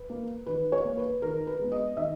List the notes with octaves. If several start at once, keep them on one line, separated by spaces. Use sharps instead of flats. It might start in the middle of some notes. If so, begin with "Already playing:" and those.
Already playing: B4
A#3
D#3 B4
C#5
A#3
B4
D#3 A#4
B4
G#3 B3
D#5
D#3 E5